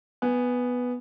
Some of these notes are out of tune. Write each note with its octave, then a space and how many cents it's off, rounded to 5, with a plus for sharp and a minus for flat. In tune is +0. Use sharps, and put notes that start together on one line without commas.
B3 +0 G#5 -10